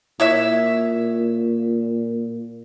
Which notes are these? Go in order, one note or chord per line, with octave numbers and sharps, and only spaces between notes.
A#2 E4 C#5 E5